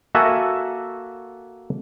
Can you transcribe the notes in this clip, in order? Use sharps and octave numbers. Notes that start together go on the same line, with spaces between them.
A#3 F#4 A4 E5 F#5 G#5